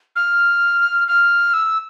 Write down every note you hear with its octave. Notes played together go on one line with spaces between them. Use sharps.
F6
F6
E6